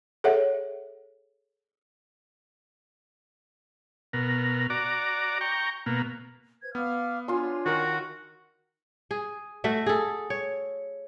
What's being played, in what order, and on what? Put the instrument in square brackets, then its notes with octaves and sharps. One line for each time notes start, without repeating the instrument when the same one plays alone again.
[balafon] G#4 A4 C#5 E5 F#5
[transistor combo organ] B2 A#4
F#4 D5 A#5 D6
G5 A#5 C#6
B2 A#3
[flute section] B4 C5 G#6
[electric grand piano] B3 [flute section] F5 D6 F6
[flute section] D4 C#5 G#5 [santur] F4 C6
[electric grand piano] D#3 A#4 [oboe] F#4
[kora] G#4
A3 F#4 E5
G#4 A4
C#5